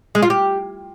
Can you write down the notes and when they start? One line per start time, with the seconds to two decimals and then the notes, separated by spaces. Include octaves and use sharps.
0.15 G#3
0.22 F4
0.30 G4